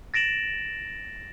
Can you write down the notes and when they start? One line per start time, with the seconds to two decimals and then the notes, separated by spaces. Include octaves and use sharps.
0.14 A6 A#6 D7 E7 F#7